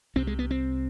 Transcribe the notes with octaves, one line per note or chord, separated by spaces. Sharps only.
C2 C3 C4
G#3
B3
C4